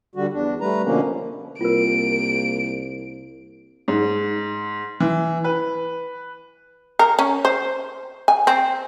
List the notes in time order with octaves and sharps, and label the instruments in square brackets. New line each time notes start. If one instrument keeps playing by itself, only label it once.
[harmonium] D3 G3 F#4
E2 D4
G3 A3 B4 A#5
B2 D3 F3 A#3 C#4
[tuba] C2 [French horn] A#3 [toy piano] F4 A#4 [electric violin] D7
[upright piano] G#2
E3
B4
[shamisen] A#4
C#4
C5
G#5
C4